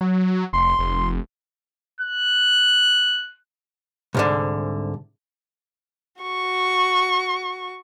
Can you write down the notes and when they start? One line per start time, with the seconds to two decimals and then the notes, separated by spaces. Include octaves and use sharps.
0.01 F#3
0.53 F1 C6
0.79 F1
2.01 F#6
4.15 C2 G#2 D3
6.22 F#4 C#6